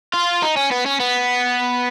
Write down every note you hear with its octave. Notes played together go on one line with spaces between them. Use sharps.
F4
D#4
C#4
B3
C#4
B3